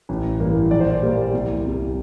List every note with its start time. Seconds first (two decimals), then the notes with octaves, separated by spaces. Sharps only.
0.09 A1
0.40 G2 E3 A#3
0.71 A#1 D5
0.80 C5
0.90 D5
1.03 A#2 G3 A#3
1.33 C2
1.64 C3 G3